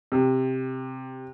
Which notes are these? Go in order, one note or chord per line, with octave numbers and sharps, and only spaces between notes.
C3